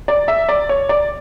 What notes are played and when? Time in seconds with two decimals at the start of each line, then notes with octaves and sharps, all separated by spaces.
0.08 D5
0.28 E5
0.49 D5
0.69 C#5
0.89 D5